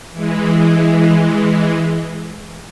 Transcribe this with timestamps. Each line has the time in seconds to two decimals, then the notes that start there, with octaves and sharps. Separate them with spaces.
0.12 E3 G#3